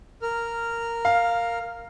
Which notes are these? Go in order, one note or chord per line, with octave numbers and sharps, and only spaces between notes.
A#4 F6
F5